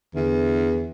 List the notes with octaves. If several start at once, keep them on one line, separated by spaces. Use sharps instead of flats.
E2 D3